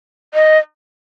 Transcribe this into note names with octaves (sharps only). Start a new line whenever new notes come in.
D#5